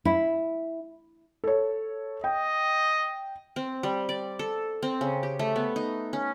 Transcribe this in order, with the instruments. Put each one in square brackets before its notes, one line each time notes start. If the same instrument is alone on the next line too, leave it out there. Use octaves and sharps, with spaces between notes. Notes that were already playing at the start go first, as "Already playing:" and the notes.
[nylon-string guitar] E4
[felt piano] A4 C#5
[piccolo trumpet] D#5 [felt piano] G5
[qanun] C4
G3
D5
A4
C4
C#3
G4
A3
B3
D#4
C#4